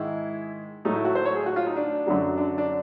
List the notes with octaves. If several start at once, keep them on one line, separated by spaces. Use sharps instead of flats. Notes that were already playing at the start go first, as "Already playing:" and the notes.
Already playing: G#2 D#3 G#3 E4
A2 F#3 A3 D#4
E4
F#4
C5
C#5
G#4
F#4
F4
D#4
D4
F#2 D3 F#3
D4
D4